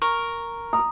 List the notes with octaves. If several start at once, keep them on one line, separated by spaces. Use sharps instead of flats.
A#4 C#6
A#5 D#6